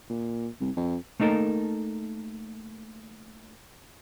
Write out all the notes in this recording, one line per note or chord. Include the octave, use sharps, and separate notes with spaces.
A#2
C2
F2
A3 A#3 D#4 A4 A#4